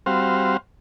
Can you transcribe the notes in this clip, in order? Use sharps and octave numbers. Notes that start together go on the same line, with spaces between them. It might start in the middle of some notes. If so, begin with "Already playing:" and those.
G3 C4 F#4 C5 F5